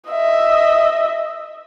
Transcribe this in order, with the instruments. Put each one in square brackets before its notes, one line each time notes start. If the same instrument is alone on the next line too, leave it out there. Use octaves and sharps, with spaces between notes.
[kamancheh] D#5 E5